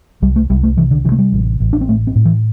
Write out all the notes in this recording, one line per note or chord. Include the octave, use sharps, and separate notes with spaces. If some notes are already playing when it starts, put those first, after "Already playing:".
C2 G3
A3
C2 G3
A3
C3 E3
D3
C3 E3
A3
G3
A1
A1
D4
C4
A2 A3
C4
A2
E3